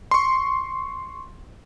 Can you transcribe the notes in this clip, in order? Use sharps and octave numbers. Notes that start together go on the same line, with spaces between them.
C6 C#6